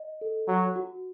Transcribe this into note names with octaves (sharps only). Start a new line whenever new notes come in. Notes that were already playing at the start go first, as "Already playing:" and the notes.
Already playing: D#5
A4
F#3 F#5
F#4